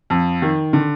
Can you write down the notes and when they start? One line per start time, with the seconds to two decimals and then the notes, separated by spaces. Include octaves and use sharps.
0.10 F2
0.42 D#3
0.73 D3